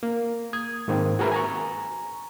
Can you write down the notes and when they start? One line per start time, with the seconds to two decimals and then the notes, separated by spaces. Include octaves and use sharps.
0.03 A#3
0.53 D#6 G#6
0.88 G#2 D#3 A#3 C4
1.19 F#4 G#4 A#4 B4 E5
1.32 G#5 A#5 C#6